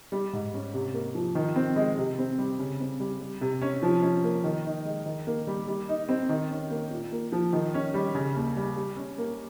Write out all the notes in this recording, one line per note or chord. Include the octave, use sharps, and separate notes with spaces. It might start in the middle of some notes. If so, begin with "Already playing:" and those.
G3
G#2
C#4
C3
A#3
F3
D#3
C4
G#3
C3
C4
G3
C#3
C4
G3
G3
C3
C#4
F3
C#4
A#3
D#3
D#4
G#3
D#3
A#3
G3
G3
D#4
C4
D#3
C#4
A#3
A#2
A#3
F3
D#3
C#4
G3
C#3
D#2
G3
G3
C#4
A#3